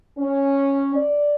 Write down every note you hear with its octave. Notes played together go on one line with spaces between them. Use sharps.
C#4
D5